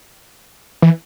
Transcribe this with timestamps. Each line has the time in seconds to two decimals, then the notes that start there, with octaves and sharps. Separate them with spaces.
0.82 E3